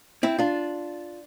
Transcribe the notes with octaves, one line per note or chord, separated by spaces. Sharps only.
C4 E4
D4 F4